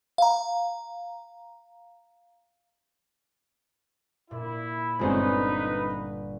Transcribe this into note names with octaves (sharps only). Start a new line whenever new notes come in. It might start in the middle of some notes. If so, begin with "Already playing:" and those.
F5 A#5
A#2 E4
G1 G#3 C4 C#4 D#4 F4 B4